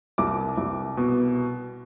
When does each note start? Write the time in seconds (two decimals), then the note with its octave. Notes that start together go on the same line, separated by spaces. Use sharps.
0.18 C2 D6
0.58 C2
0.97 B2